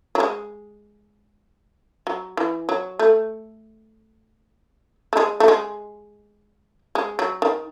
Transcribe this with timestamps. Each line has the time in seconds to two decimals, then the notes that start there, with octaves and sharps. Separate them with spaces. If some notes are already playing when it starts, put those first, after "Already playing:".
0.15 F#3
0.20 G#3
2.07 F#3
2.37 E3
2.69 F#3
2.99 A3
5.13 A3
5.17 G#3
5.40 A3
5.48 G#3
6.95 G#3
7.19 F#3
7.42 D#3